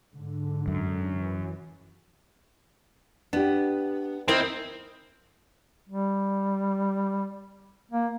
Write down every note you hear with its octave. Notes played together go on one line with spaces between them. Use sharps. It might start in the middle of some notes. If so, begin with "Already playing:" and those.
G#2 D3
F#2
E3
B3 D4 G4
C4 D#4 E4 A#4 D#5
G3
A#3